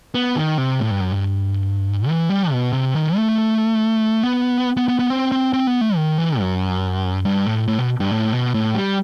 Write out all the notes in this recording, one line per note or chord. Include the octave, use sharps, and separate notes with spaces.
B3
D#3
C3
A2
G2
F#2
G2
E3
G3
B2
C3
D#3
A3
B3
B3
B3
B3
C4
C4
C4
B3
A3
D#3
E3
F#2
G2
A2
A2
B2
G2
A2
B2
A2
G3